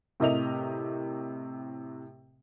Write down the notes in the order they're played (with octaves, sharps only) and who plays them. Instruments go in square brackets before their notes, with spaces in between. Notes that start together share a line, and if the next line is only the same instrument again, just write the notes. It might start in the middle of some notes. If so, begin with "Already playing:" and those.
[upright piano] A2 C3 A#4 D#5 E5 F7